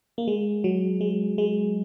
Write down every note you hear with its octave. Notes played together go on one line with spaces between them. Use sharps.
A#3
G#3
F#3
G#3
G#3